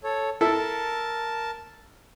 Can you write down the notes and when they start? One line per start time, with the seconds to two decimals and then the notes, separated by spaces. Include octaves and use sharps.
0.04 A4 C#5
0.41 E4 A4 A#4 A5